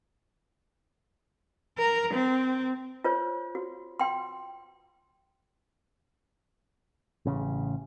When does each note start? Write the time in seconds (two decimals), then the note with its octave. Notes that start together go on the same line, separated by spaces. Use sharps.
1.78 A#4
2.14 C4
3.04 F4 C5 C#5
3.55 F#4
4.00 G5 C6
7.25 A1 C#3